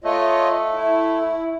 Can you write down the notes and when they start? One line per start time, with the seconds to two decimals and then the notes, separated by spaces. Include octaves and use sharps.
0.04 A3 F4 C#5 D#5
0.73 E4